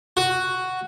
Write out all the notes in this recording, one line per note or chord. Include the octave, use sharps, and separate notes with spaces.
F#4